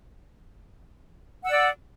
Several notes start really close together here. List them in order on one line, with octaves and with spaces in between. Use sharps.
F#5 E6 D5